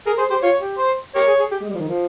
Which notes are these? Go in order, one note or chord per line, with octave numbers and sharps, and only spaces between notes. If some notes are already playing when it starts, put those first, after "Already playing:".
G#4 A#4
G#4 C5
G4 C5
F4 C#5
G4
C5
G4 A#4 C#5
G#4
G#4
G4
G#3
G3
F3
D#3
F3